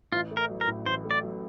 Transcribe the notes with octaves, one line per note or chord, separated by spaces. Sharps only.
A1 F4
A3
A#4
F#3
A#4
A2
A1 C5
A3
D5
F#3